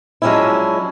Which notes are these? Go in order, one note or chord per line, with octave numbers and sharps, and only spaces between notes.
F3 F#3 G#3 C#4 D4 E4